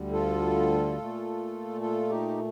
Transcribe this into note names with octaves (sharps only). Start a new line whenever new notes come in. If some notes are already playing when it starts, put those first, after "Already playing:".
Already playing: D2 D3 G3
F4 A4
A#2 A3
F4 A4
D#4 G4